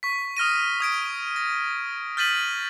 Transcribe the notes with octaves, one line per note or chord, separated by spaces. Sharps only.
C#6 B6
D#6 F6 A#6 D#7
D#6 G#6 D7
A#6
F6 G6 A6 B6 D#7 F#7